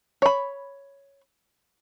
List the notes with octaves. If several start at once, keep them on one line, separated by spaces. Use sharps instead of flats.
C#5 B5